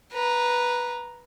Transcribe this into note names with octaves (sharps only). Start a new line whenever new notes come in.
B4 A#5